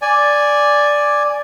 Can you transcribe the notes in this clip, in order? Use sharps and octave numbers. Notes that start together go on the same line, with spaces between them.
D5 G#5